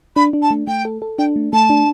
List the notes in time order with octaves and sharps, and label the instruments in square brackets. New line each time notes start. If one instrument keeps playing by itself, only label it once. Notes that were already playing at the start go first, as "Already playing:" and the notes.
[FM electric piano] D4 [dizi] B5
[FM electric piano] D4
[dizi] A5
[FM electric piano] A3
[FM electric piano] A3 [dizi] G5
[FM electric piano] A4
A4
[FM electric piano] D4 [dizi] G5
[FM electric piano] A3
[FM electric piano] A3 [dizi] A5
[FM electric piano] D4